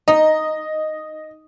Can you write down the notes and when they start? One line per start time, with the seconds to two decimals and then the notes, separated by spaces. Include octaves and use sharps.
0.08 D#4 D#5